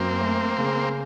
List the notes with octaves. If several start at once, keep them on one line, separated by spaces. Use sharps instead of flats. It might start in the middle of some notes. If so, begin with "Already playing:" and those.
Already playing: F#2 A#3 C4
A3
C#3